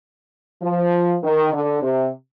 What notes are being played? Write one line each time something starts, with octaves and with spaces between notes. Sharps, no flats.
F3
D#3
D3
C3